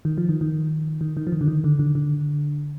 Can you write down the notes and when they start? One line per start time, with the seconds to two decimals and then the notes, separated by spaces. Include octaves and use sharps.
0.05 D#3
0.18 F3
0.29 D#3
0.41 D#3
1.01 D#3
1.17 D#3
1.27 F3
1.32 D#3
1.41 D3
1.48 D#3
1.64 D3
1.79 D3
1.95 D3